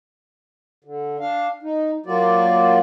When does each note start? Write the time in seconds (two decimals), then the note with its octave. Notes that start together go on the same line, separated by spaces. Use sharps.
0.84 D3
1.20 D4 F5
1.63 D#4
2.06 F#3 A#3 F4 F#4 D5